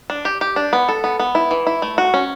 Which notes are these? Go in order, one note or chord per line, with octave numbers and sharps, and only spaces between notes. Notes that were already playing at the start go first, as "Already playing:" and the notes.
D4
G4
G4
D4
B3
A4
B3
B3
E4
E3
E4
A3
F#4
C#4